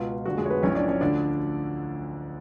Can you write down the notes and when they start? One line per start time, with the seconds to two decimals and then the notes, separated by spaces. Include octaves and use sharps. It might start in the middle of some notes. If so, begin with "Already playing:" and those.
Already playing: C#2 B2 F4
0.25 F1 F2 D3 F3 F#4
0.38 G#3 G#4
0.46 C#5
0.50 B3 B4
0.63 B1 A2 F3 C#4 C#5
0.75 D4 D5
0.88 C#4 C#5
1.01 D2 D3 F3 D4 D5